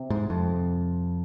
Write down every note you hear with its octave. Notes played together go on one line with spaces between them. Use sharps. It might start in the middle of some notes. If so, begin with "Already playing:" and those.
Already playing: C3 C4
G#2
F2